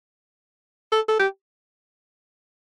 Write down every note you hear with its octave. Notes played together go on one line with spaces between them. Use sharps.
A4
A4
G4